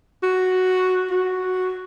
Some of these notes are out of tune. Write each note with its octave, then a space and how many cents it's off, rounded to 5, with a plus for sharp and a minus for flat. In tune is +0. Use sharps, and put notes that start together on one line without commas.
F#4 +0
F#4 +0